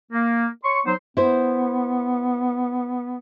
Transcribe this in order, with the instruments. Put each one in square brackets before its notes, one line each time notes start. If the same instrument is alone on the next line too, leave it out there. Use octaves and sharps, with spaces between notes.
[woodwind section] A#3
C#5 C6 C#6
F#3 B3 D#4 C5
[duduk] B3 [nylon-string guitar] E4 C5